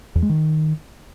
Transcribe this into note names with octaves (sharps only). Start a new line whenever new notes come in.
E2
G#3
D#3